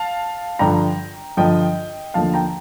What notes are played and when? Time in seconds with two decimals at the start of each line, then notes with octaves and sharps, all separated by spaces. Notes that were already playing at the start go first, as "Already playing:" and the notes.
Already playing: F5 A5
0.59 G2 D3 F3 G5 A#5
1.37 G2 D3 F3 D#5 G5
2.14 D#2 D3 F3 F5 A5
2.34 G5 A#5